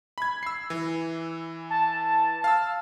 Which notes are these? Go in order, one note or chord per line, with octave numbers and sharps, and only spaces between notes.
B5 G#6
E6 C7
E3
A5
F5 E6